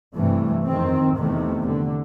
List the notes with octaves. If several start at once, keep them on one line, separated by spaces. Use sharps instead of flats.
G2 C3 E3 G3 A3
F2 D#3 C4
E2 C3 D#3 A3
D3